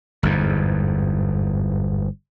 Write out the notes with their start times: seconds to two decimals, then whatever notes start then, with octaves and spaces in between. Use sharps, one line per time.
0.23 G1 E2 G#2